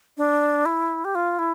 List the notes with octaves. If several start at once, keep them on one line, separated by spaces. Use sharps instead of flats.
D4
E4
G4
F4
E4